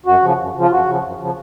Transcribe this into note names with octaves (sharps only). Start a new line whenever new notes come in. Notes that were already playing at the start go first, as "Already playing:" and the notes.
F#2 F#4
C#3 F3
F#2
C#3 F3 F4
F#2 F#4
C#3 F3
F#2
C#3 F3